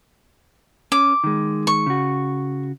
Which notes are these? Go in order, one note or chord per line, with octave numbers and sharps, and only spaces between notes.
C#4 D6
D#3 G#3
C#6
C#3 F#4